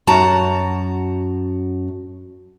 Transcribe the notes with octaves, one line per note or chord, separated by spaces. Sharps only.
F#2 F#4 A5 A#5